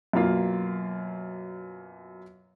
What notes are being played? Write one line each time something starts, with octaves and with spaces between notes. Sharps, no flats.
F#2 B2 A#3 F4